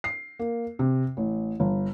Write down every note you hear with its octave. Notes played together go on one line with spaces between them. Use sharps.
C7
A#3
C3
A1
G1